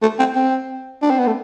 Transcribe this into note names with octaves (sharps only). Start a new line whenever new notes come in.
A3
C4
C4
D4
C4
B3
A3